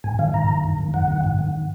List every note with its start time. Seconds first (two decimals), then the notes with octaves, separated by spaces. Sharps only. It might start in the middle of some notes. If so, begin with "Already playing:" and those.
0.04 G#2 G#5
0.19 D#3 F5
0.34 G#2 A#5
0.49 D#3
0.64 F#2
0.78 D#3
0.94 F#2 F#5
1.08 D#3
1.24 G#2
1.39 D#3